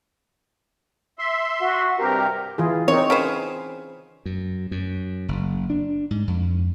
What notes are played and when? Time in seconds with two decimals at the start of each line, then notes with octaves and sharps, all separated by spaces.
1.19 E5 C6
1.61 F#4
1.99 G2 C3 G4 A#4
2.58 E3 F4 G#4
2.88 C4 D#4 A#4 C#5
3.10 C#3 B4 C5
4.26 F#2
4.71 F#2
5.28 F#1
5.70 D4
6.11 G#2
6.27 F2